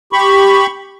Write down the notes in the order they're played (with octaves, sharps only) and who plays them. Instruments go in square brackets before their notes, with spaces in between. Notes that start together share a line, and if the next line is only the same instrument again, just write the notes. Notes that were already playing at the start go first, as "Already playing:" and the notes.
[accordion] G4 B5 C#6